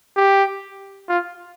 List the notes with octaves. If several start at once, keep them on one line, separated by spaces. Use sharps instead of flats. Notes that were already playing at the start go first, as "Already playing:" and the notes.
G4
F4